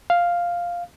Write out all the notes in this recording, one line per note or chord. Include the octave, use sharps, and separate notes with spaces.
F5